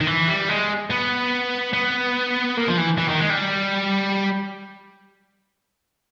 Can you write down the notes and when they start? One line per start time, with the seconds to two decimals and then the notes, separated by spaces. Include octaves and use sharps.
0.01 D#3
0.07 E3
0.28 G3
0.49 G#3
0.90 B3
1.73 B3
2.57 A#3
2.68 F3
2.78 E3
2.98 E3
3.08 D#3
3.20 G#3
3.30 G3